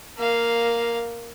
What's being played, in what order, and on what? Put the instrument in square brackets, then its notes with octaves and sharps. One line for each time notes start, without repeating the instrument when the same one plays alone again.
[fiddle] A#3 F5